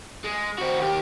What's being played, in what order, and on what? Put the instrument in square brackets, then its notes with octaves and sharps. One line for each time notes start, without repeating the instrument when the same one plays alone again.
[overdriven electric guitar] G#3
C4 F#4
D#2 G4